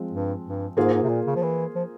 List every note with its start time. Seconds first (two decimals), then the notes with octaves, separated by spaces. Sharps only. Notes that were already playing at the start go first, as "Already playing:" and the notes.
Already playing: F3 G#3 C4
0.11 G2
0.44 G2
0.77 G#2 A#3 F4 G#4 C5
0.93 G#2
1.03 C3
1.09 A#2
1.27 C#3
1.36 F3
1.43 E3
1.75 F3